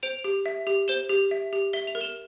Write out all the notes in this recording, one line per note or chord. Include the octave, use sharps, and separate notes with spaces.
C5 D7 F7
G4
E5
G4
C5 E7 G7
G4
E5
G4
E5 G7
F7
A#4
E7 G7